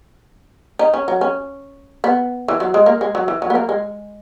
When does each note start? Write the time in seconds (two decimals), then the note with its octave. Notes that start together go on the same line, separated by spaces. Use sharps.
0.79 D#4
0.94 C#4
1.08 F#3
1.21 C#4
2.04 B3
2.48 E3
2.60 F#3
2.74 G#3
2.86 A#3
3.01 G#3
3.15 F#3
3.28 E3
3.42 F#3
3.50 B3
3.55 A#3
3.69 G#3